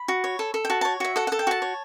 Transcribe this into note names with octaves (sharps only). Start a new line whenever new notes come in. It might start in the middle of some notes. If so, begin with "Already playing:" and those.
Already playing: B5
F#4
C#5
A4
A4
G5
F#4 A5
C#5 A5
F#4 E5
A4 F#5
A4 F#5
G5
F#4 A5
C#5